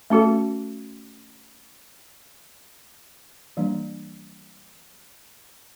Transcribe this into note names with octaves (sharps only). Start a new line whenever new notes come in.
A3 C#4 F#4 A4
E3 G3 A#3 D4